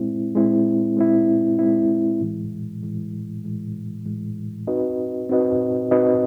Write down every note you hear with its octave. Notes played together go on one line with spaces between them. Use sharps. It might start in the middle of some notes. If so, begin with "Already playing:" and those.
Already playing: G#3 C4 E4
G#3 C4 E4
G#3 C4 E4
G#3 C4 E4
A2 E3 G#3
A2 E3 G#3
A2 E3 G#3
A2 E3 G#3
C4 D#4 F#4 B4 D#5
C4 D#4 F#4 B4 D#5
C4 D#4 F#4 B4 D#5